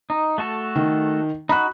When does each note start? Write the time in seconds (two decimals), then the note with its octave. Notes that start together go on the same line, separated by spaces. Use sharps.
0.10 D#4
0.38 A3 F#4 A4
0.76 D#3
1.49 D#4 F#4 B5 F#6